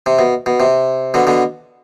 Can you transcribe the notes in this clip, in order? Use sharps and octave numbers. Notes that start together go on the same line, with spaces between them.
C3
B2
B2
C3
B2 D3
B2 D3